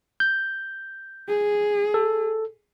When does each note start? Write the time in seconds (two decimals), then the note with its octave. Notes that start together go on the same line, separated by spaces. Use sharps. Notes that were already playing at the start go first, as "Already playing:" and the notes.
0.20 G6
1.29 G#4
1.94 A4